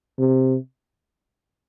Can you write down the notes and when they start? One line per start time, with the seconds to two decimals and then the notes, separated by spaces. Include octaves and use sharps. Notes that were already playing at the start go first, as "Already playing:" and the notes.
0.19 C3